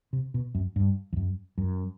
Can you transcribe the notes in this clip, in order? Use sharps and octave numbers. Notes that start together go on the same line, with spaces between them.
C3
B2
F#2
G2
E2
F#2
F#2